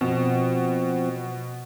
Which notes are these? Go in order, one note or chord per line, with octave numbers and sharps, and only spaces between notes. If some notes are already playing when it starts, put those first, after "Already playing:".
B2 F3 C4